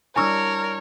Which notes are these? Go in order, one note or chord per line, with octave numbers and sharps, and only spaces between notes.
G3 D4 E4 A#4 C#5 G#5 C#6 E6